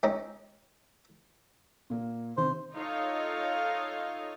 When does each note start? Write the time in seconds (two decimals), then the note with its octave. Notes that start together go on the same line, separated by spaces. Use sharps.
0.03 G#3 C4 C#4 D#4
1.90 A#2 A#3
2.37 C3 D#3 C5
2.76 D#4 F4 A4 C#5 D#5 F5